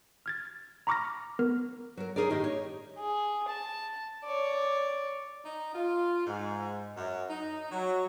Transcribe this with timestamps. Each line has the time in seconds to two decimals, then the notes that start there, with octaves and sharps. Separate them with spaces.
0.26 F6 G#6 A6
0.87 A#5 B5 C#6 D6 F6 A#6
1.39 B3 A#4 F6
1.97 F#3 A#4
2.16 D#4 G#4 A#4 C#5 D5
2.30 A2 D#3 D#4 G4
2.44 C#5
2.99 G#4
3.48 A5
4.24 C#5 D5
5.45 D#4
5.75 F4
6.26 G#2
6.97 F#2
7.30 D#4
7.72 F#3